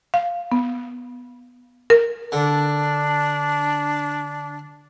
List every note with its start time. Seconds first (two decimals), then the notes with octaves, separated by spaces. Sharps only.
0.14 F5
0.52 B3
1.90 A#4
2.32 D3 D4